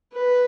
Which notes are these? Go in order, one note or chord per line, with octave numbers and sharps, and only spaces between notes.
B4